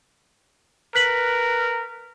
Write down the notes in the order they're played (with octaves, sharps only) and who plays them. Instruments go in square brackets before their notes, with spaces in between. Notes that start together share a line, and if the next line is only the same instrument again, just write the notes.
[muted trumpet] A#4 [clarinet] B4 [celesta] F#6 B6 F#7